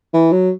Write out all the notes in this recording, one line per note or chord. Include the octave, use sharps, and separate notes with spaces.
E3
F#3